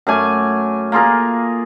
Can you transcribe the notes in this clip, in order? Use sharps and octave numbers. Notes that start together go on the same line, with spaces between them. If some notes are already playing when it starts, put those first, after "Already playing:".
F#2 A3 G#5 D6
A#3 F4 G#4 A#4